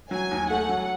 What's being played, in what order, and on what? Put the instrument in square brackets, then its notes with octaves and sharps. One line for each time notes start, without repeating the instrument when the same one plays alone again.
[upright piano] F#3 [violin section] G#5
[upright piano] D#2
[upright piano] A3 [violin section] F#5
[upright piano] F#3